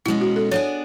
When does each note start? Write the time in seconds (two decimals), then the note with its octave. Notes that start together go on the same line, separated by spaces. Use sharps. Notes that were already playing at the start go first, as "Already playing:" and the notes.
0.05 B2 E4
0.08 G#3 C#4
0.21 F#4
0.36 A4
0.51 B3 D4 G#4 C#5